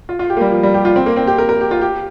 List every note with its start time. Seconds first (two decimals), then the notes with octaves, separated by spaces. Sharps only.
0.09 F4
0.19 F4
0.30 G4
0.37 A#3
0.41 G3
0.52 F3
0.63 G3
0.74 G4
0.85 F4
0.96 C4
1.06 A#3
1.16 C4
1.27 G4
1.38 A#4
1.49 A#4
1.61 G4
1.71 F4
1.82 G4